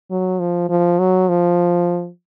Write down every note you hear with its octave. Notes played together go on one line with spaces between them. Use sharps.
F#3
F3
F3
F#3
F3